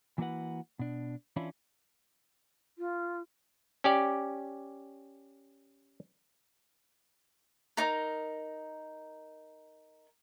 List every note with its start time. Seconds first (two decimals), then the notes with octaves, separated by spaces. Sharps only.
0.18 E3 A#3 E4 F#4 B4 F#5
0.79 B2 D4
1.36 E3 C#4 D4 E4 F4
2.78 F4
3.84 C#4 G4 D5
7.77 D#4 A#4